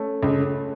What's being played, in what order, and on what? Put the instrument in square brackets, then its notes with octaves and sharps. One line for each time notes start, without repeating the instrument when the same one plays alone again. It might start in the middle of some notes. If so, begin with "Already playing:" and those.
Already playing: [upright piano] A3 C#4
[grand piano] C#2